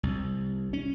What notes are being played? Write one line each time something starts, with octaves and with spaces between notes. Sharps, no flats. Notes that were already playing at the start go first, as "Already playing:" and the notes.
C2
C#4